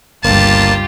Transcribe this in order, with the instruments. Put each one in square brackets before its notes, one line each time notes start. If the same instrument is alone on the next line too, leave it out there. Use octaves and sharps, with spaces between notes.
[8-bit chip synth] G1 A#3 [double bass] C#2 G2 [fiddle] F4 G4 [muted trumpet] A5